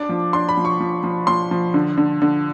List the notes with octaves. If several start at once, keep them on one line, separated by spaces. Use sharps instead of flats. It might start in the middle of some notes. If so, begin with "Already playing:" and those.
Already playing: D4 D6
F3
D4 C6
B5
F3
C#6
F3
F3
F3 C6
F3
D3
D3
D3